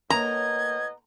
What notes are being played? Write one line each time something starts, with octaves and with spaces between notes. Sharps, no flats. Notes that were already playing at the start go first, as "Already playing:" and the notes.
A2 A#3 B3 C#5 D#5 A#5 G#6